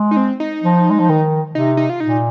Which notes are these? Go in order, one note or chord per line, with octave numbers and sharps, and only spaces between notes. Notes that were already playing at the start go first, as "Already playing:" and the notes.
Already playing: G#3
D#4
C4
D#4
F3
G#3
F3
D#3
C3 D#4
D#4
F4
A#2 D#4